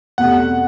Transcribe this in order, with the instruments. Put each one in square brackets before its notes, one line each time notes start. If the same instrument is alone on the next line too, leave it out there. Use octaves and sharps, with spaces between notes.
[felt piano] E2 B2 A3 C4 G4 [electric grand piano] F#5